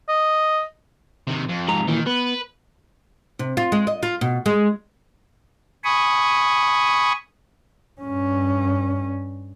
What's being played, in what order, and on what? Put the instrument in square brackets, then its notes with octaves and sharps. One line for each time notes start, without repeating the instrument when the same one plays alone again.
[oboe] D#5
[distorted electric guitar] C3 D#3
F2
[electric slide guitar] G#2 C3 A#5
[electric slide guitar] A#2 E3 [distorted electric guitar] D#3
[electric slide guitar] B3 [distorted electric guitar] B4
[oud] C3
F4
G#3
D#5
F4
B2
G#3
[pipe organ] G#5 B5 C#6 D#6
[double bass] G2 C#4